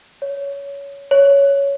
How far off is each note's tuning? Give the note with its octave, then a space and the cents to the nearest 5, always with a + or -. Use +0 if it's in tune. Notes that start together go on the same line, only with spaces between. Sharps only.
C#5 +15
C#5 +10